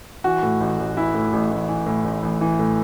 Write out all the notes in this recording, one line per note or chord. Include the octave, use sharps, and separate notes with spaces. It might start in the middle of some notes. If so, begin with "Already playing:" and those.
E3 F#4
A2
A1
A1
E3 E4
A2
A1
A1
E3
A2
A1
A1
E3
A2